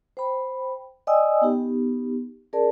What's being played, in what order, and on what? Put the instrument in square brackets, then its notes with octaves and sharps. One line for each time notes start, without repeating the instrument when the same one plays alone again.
[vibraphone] C5 G5 B5
D5 D#5 G5 G#5 D#6 E6
B3 D#4 G4
C#4 G#4 A#4 D5 A5